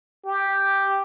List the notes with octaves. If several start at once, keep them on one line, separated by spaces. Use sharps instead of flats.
G4